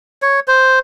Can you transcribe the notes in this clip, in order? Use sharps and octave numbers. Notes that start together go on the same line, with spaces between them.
C#5
C5